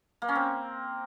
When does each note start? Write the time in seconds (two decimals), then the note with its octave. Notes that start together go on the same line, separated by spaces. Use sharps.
0.22 A#3
0.29 C#4
0.35 C4